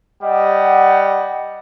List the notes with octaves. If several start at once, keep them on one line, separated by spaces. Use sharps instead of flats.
G3 D#5 F#5